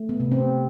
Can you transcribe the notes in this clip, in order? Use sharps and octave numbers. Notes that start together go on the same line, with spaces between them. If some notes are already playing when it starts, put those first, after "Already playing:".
Already playing: A3
B3
C3
C4